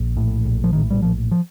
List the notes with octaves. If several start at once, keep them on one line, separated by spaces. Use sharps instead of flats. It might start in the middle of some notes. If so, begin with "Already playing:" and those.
Already playing: A#1
A2
A#1
F3
A2 D#3
G3
A#1 F3
F3